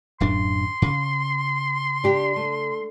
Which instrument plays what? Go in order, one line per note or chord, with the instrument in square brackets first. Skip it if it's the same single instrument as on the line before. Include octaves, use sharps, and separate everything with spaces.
[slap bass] D1 F#2 D4 [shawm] C6
[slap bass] C#3
[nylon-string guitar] D4 G4
A3